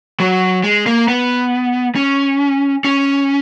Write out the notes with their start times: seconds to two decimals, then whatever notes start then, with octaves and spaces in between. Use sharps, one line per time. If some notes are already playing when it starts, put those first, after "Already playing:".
0.20 F#3
0.64 G#3
0.86 A#3
1.08 B3
1.96 C#4
2.85 C#4